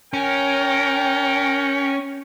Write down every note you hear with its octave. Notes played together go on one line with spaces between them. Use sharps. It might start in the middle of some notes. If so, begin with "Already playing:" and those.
C#4 A#4 G5